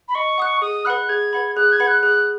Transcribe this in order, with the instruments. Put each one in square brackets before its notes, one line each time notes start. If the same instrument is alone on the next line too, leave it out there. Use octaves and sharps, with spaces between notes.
[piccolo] B5
[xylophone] D#5 [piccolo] C#6
[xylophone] F#5 D#6 F#6
[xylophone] G#4 [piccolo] D#6
[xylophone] B4 F#5 B5 [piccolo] F#6
[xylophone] G#4 [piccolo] G#6
[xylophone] B4 F#5 B5
[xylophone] G#4 [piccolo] F#6
[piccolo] G#6
[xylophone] B4 F#5 B5
[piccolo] F#6
[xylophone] G#4 [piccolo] F#6